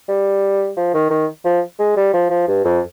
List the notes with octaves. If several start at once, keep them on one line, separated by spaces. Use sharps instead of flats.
G3
F3
D#3
D#3
F3
G#3
G3
F3
F3
G2
F2